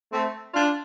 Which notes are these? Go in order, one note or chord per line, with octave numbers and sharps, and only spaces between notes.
A3 C4
D4 F4